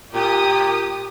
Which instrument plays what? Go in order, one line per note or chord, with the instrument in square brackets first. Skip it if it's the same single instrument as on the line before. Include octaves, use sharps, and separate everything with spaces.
[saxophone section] A#2 [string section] G4 D#6